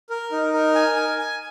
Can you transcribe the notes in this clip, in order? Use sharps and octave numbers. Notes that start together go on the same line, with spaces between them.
A#4
D#4
A#4
G#5
G#5
G#5